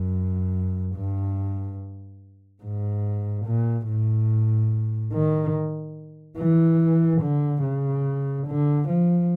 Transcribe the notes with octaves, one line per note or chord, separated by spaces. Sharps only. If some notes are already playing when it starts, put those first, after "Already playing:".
Already playing: F#2
G2
G#2
A#2
A2
D#3
E3
D3
C#3
D3
F3